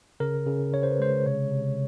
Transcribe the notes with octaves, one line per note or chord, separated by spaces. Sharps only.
C#3 A#4
C#3
C#3 C#5
C5
B4
G#3 C5
C3 C#5
C3